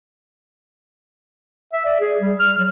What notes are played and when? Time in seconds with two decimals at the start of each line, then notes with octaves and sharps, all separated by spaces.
1.73 E5
1.85 D5
2.00 G#4
2.21 G3
2.40 F6
2.58 F#3